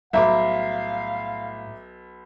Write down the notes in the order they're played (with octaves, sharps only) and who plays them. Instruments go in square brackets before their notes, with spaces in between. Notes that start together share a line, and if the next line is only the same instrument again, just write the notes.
[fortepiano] B1 [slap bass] A2 G3 [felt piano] E5 A#5 D6 [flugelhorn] F5